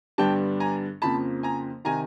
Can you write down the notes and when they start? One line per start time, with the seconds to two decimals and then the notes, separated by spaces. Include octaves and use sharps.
0.18 G2 D3 G3 B3 D4 G5 A5
0.60 G#5 A#5
1.02 F2 C#3 F3 A#3 A5 B5
1.43 G#5 A#5
1.85 C3 D#3 G#5 A#5